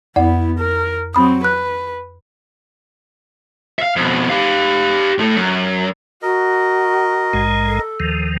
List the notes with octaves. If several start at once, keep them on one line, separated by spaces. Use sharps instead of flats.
F2 B3 E4 D5 F#5
A#4
F#3 C4 B5 D#6
B4 F#6
E5 F5
F2 B2
G4 F5
A2 A3
F#2
F#4 A#4 D#5
A#1 G#2 G#3
A4
D#2 D#3 F3